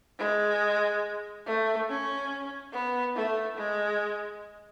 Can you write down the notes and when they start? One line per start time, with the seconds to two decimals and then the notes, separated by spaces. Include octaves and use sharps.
0.19 G#3
1.46 A3
1.89 C#4
2.73 B3
3.16 A3
3.58 G#3